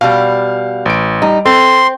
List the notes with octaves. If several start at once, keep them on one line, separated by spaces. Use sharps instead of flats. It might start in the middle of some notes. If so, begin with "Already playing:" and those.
B2 G3 F5
A1 D7
G3 D#4
C4 A4 C6